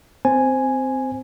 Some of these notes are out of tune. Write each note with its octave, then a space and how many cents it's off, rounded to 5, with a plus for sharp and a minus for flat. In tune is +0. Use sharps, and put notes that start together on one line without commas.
C4 -10 C5 +0 G#5 +0